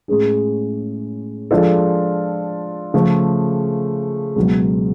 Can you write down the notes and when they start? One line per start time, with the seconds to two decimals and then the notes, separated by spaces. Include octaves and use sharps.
0.08 A2 G#3 C#4 G#4
1.51 F3 G#3 D4 F4 A4
2.94 C#3 F3 A3
4.36 C#2 B2 F#3